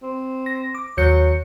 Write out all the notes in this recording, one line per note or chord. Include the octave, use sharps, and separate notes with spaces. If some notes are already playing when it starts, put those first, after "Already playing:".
C4
A#6
D6
D#2 F#3 G6 C#7